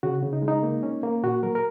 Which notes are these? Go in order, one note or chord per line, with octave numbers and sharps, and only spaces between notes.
C#3 F#4
C#3
D#4
G#3
D#4
A#3
C#4
A#3
A#2 F#4
F#3 A#4
A#4